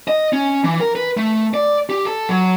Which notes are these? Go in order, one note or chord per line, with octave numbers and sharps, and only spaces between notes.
D#5
C#4
E3
A#4
B4
A3
D5
G4
A4
F#3